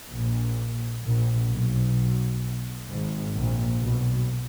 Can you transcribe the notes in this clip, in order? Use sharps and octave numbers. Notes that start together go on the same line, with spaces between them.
A#1 A#2
A#1 A#2
B1 B2
G#1 G#2
A#1 A#2
B1 B2